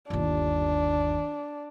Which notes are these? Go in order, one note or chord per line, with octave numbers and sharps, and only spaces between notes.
G1 D#2 D4